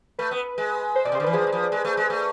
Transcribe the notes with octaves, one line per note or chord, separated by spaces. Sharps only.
A3 B4
B3
G#3
C5
B2 D5
C3
C5
D3
E3 B4
F3 G#4
G#3
F3
G#3
A3
G#3
A3